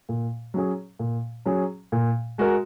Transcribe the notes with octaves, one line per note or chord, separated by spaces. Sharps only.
A#2
F#3 C#4 G#4
A#2
F#3 C#4 G#4
A#2
G#3 F#4 A#4